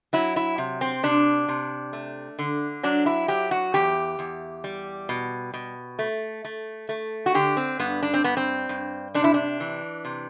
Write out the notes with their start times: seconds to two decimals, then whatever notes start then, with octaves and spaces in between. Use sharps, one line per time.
0.13 F#3 E4
0.36 E4
0.58 C3
0.81 C4
1.03 C3 D4
1.48 C3
1.93 A3
2.39 D3
2.83 F#3 D4
3.06 E4
3.28 F#3 G4
3.51 F#4
3.74 E2 G4
4.19 E2
4.64 G3
5.09 B2
5.54 B2
5.99 A3
6.44 A3
6.89 A3
7.26 F#4
7.34 D3 G4
7.57 C4
7.79 G2 B3
8.02 D4
8.14 C4
8.24 G2 B3
8.37 C4
8.69 G2
9.14 C3 D4
9.24 E4
9.34 D4
9.60 E3
10.05 C3